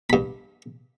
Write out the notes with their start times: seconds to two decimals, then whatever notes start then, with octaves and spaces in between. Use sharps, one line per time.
0.10 G2 B5